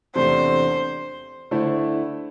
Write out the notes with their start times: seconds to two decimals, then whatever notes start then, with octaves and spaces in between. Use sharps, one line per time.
0.15 E2 C3 A3 D4 C5
1.51 D3 A3 E4 C5